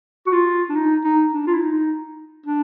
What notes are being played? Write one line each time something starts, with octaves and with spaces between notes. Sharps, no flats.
F#4
F4
D4
D#4
D#4
D4
F4
E4
D#4
D4